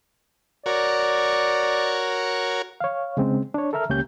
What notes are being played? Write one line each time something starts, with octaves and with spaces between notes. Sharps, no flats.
F#4 A#4 C#5 D5
C#5 F5
C#3 G#3 C4 C#4
D4 C#5
A4 A#4 E5 A#5 F6
C#2 A#3 C#4 G4 G6